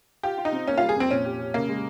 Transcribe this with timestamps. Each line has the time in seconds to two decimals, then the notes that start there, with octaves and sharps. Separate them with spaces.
0.23 F4 G4
0.38 F4
0.45 D#4
0.53 C4
0.67 A#3 C#4
0.78 G3 F4
0.89 G#4
0.96 F2 C4
1.11 A#2 C#4
1.25 G4
1.39 G4
1.54 C#3 A#3
1.69 G#3